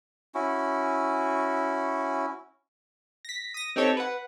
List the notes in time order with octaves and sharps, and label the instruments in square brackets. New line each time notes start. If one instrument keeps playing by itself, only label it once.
[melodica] C#4 E4 F#4
[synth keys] A#6 B6
D#6 A#6
C4 D#4 G4 A4 C#5
B4 F#5